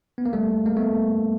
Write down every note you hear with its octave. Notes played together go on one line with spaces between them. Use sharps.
B3
A#3
G3 A3
G#3 A#3
A3 B3